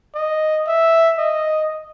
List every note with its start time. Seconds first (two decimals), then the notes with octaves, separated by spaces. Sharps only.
0.15 D#5
0.67 E5
1.18 D#5